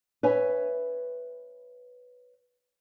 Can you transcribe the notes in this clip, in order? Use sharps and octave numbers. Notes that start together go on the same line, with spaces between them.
B4 C#5 E5 G#5